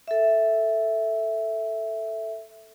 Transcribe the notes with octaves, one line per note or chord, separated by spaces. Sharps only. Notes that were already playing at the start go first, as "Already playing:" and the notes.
A4 E5